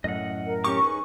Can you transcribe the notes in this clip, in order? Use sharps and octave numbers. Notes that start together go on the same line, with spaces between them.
F#2 A2 D#5 F#5
A#4
C#4 G4 C#6 D6
D#4 G#4 B4